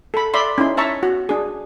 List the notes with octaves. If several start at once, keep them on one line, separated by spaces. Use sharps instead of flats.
A4 B5
D5 E5 B5 C6
C#4 D#4 E4 C6
C#5 E5 A5 A#5 C#6
F#4
D4 G#4